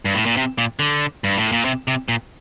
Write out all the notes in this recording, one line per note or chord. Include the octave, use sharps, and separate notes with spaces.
G2
A2
A#2
C3
A#2
D3
G2
A2
A#2
C3
C3
A#2